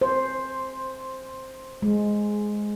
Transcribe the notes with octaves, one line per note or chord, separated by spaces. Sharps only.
C5
G#3